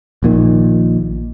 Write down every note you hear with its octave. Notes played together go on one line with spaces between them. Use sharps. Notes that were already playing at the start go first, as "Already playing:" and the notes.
A#1 A#2 D#3